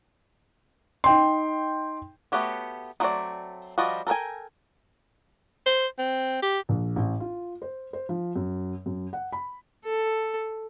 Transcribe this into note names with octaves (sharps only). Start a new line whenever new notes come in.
D#4 G5 C6
A3 B3 F#4 G4 C#5
D#3 F#3 A3 C4 D5
F3 G3 F#4 D5 D#5
A4 A#4 C#5 G5 G#5
C5
C4
G4
A#1
A1
F4
C5
C5
F3
F#2
F#2
F#5
B5
A4